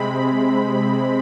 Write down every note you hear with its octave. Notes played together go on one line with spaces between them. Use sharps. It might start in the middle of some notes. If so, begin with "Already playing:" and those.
Already playing: C3 G#3 C4 B5